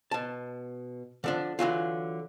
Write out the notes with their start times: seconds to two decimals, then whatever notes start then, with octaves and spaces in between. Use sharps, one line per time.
0.11 B2 A5
1.24 D3 F3 D4
1.59 D3 E3 F#3 F4